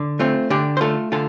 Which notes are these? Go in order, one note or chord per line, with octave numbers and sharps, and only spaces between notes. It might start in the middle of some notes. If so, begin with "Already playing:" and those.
Already playing: D3
A3 C4 F4
D3 D4 G4
C5
A3 F4 A4
D3 F4 A4